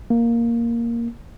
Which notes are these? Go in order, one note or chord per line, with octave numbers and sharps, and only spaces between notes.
A#3